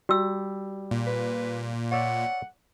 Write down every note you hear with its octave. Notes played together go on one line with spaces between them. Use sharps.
G3 F#4 E6
A#2
B4
C#5 D5 E5 F#5